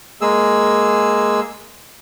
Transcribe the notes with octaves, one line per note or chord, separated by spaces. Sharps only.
G#3 A#3 G#4 E6